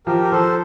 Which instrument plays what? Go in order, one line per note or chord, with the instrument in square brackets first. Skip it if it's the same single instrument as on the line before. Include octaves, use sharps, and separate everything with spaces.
[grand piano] F3 [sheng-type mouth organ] G4 A#4
[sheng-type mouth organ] A#4
[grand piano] F3 [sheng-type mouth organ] A4 C5